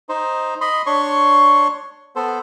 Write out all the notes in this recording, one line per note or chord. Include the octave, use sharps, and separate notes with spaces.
D#4 C5
D#5 B5 C6
D4 C#5 C6 C#6
B3 A4 C5